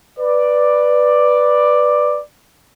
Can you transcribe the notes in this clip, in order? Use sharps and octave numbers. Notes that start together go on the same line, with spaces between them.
B4 D5